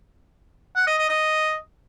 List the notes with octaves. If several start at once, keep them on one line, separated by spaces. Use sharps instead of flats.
F#5
D#5
D#5
D#5